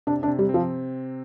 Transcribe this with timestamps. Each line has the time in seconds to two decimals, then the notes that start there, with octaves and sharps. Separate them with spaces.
0.07 C3 D4
0.23 D4
0.28 C3
0.39 G3
0.49 C4
0.54 F3